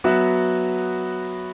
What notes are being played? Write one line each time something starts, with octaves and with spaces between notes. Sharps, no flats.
F#3 B3 F#4 E5